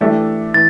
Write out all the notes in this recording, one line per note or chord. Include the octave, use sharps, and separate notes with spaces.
E3 A3 D4 G4
E3 A6